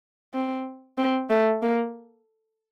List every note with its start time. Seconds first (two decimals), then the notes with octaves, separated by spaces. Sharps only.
0.34 C4
0.98 C4
1.30 A3
1.63 A#3